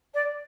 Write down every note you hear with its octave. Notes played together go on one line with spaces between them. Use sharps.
D5